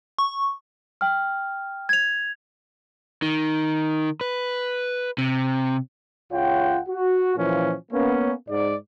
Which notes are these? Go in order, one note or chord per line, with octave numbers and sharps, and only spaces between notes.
C#6
G5 F6
G#6 F7
D#3
B4
C3
C#2 F4 C#5 F#5 G5
F#4
A#2 E3 F3 C#4
A#3 B3 C#4
G#2 D5